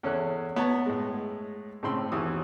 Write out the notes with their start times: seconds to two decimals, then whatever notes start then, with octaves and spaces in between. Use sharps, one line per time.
0.03 E2 C#4 A4 C#5 F#6
0.56 B3 C#5 A5 A#5
0.86 A2 G#3
1.83 A2 C#3 C4 B5 C6 E6
2.12 D#2 B2 E3 D#6